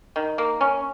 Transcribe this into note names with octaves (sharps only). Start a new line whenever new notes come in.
D#3
A#3
C#4